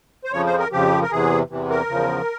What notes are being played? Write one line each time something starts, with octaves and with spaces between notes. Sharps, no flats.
C5
F2 C#3 F3 C#5
C5
A#4
F2 C#3 F3 G4
A#4
E2 C3 E3 G#4
E2 C3 E3
A#4
E2 C#3 F3